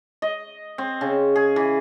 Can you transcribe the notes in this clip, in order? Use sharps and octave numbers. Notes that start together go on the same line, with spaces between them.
D#5
C4
C#3
G#4
E3